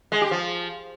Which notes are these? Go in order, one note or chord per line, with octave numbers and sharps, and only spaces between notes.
G#3
G4
F3